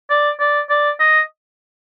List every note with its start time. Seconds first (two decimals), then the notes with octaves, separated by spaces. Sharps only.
0.10 D5
0.40 D5
0.70 D5
1.00 D#5